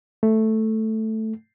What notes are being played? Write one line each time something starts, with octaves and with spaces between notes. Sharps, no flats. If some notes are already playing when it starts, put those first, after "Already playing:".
A3